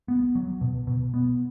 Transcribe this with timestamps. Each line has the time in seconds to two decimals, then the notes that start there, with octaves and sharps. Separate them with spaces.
0.08 B3
0.35 F#3
0.61 B2
0.87 B2
1.14 B3